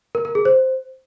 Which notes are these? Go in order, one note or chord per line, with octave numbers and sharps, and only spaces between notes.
A#4
A#4
G#4
C5